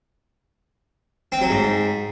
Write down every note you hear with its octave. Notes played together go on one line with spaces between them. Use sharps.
C4
F#3
G#2